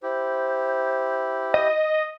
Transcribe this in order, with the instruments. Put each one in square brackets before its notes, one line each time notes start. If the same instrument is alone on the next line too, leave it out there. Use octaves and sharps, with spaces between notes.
[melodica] E4 G4 [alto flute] C5
[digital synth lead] D#5